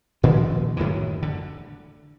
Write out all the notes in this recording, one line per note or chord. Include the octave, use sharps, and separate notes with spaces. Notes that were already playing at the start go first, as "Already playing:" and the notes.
A#2 D#3 F3 G#3
F#2 A2 D#3 E3
D3